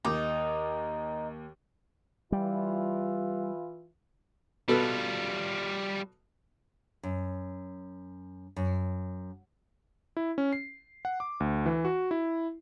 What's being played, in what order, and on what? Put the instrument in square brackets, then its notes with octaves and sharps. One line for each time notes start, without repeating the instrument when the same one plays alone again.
[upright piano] D#2 D6 [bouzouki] D#4
[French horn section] E3 F4 [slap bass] G3
[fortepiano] B2 A4 B4 [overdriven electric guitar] G3 F4
[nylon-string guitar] F#2
F#2
[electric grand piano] E4
C#4
C7
F#5
D6
D2
E3
F#4
E4